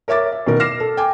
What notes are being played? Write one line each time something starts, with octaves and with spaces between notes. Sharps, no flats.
A#4 C#5 E5 D6 A6
E5
B2 D#3 A#4
D6 F6 A#6 C7 E7
A4
G5 G#5 D6